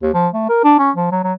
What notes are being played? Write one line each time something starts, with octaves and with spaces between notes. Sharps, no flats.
D#2
F3
A3
A#4
D4
C#4
F3
F#3
F#3